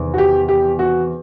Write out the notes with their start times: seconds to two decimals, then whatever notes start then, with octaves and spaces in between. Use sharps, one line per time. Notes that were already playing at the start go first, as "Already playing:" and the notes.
Already playing: E2 C3 D#3
0.14 F#4
0.18 G4
0.49 G4
0.79 F#4